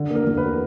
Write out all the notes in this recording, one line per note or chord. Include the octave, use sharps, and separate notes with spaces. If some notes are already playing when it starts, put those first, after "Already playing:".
Already playing: D3
A#3
A#4
E2
B4